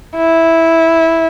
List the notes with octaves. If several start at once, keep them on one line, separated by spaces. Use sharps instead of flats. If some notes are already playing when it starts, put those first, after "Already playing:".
E4